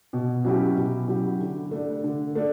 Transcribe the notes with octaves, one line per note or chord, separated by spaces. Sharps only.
B2
F#3 C#4 E4 G4
B2
F#3 C#4 E4 G4
D3
A3 D4
D3
A3 D4